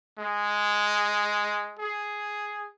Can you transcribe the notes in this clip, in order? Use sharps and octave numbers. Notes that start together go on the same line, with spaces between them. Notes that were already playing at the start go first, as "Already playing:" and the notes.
G#3
G#4